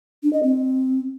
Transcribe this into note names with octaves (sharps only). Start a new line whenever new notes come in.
D4
D#5
C4